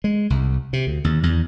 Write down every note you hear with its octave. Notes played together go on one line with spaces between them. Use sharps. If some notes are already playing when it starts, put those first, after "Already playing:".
G#3
C2
C3
D2
D#2
E2